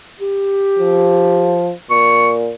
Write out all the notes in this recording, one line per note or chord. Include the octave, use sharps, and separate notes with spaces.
G4
F3
A#2 C#6